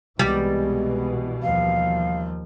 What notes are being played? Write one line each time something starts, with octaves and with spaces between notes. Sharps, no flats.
C2 B2 E3 G3 G#3 D5
D#2 F3 F5